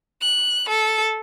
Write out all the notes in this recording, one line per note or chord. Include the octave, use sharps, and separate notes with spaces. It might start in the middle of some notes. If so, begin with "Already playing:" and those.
F#6
A4